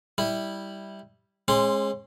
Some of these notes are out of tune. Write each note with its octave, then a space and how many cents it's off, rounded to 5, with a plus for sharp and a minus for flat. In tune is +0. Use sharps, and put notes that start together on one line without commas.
G3 +0 E4 -10
G#3 +0 C#4 -40 C6 +0